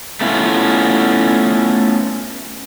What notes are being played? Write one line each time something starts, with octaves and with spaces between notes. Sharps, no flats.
A3 B3 C#4 E4 F4